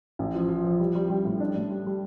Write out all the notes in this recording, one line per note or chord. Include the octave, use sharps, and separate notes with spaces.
A1
F3
F3
F3
G3
G3
G3
A2
D4
A2
G3
G3